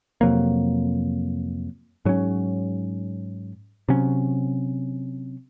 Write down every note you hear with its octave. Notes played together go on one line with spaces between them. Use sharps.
F2 C3 F#3 A#3
G#2 F#3 C#4
C3 F#3 C#4